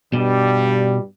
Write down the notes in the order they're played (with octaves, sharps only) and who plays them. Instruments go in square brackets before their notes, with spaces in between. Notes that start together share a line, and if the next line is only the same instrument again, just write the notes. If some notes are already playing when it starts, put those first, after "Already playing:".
[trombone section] G2 G3 [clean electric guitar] B2